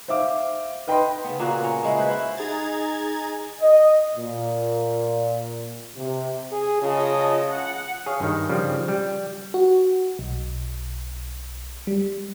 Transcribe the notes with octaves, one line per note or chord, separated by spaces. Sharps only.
C5 E5 F5 D6
B4 D#5 G5 B5 C6
C#3 B3
A#2 A#3 F#4
C#4 A#4
C#3 G#3 E4
F#4 B4 C5
E4
D#4 G#4 A#5 G#6 A6
D#5
A#2
C3
G#4
C#3 F4 D#5 A5
F#5
G#4 C#5 F5
G2 D#3
C#3 F3 G3
G3
F#4
B1
G3